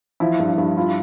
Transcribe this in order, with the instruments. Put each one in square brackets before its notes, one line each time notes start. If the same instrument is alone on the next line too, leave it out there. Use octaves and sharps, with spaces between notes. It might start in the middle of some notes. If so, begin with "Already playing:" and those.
[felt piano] F3 [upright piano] E4
[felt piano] G2
[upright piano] E4
[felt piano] G2
[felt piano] E4 [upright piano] F4